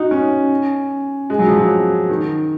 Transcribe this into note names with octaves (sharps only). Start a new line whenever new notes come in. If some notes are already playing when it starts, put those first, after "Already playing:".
Already playing: D#4 F#4
C#4
G#3
F#3
F3
F#3
D#3